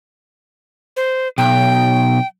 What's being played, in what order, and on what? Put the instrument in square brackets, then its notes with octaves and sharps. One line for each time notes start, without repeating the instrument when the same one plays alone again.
[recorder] C5
[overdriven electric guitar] B1 [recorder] G5